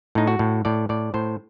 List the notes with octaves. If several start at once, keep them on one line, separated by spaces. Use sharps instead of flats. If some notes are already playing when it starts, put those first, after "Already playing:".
A2 D#4
F#4
A2
A2 D5
A2 D5
A2 C5